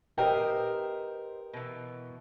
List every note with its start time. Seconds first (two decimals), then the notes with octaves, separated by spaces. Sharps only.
0.18 B3 D#4 G4 A#4 C5 E5 G5
1.53 B2 E3